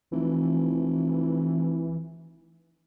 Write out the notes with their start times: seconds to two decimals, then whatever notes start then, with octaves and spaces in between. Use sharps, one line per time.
0.12 F1 E3